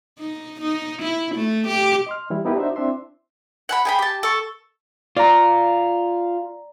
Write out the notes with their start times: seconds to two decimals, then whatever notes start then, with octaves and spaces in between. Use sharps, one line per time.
0.19 D#4
0.61 D#4
1.02 E4
1.35 A3
1.68 G4
2.06 D#5 C6 F6
2.30 E3 G3 E4
2.45 B3 D#4 E4 G4 A#4 B4
2.56 D4 D#4 F#4 C5 E5
2.76 C4 D4 E4 E5 C6
3.69 F#5 G#5 B5
3.85 G#4 G5 B5
3.99 G4 A5
4.23 A4 C#6
5.17 F4 D5 A#5